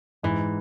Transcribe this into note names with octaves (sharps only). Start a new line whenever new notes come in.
G#2 E3